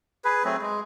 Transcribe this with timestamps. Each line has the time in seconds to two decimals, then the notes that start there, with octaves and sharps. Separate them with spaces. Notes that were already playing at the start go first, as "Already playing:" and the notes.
0.25 G#4 B4
0.44 F#3 A3 C4 G#4
0.62 G#3